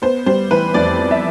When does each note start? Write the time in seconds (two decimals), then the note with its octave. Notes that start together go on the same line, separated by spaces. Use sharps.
0.02 B3 C5
0.26 G3 C5
0.51 E3 B4
0.74 F2 D5
0.98 B3
1.11 E5